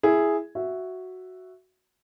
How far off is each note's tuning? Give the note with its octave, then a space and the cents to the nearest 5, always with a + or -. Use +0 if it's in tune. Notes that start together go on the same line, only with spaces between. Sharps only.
E4 +5 G#4 +0
F#4 +0 E5 +5